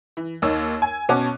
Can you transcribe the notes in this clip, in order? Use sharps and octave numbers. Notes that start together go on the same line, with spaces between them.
E3
D#2 A#3 D#4 C#5 E6
G#5
B2 C#4 F#4 C#5 A5 D6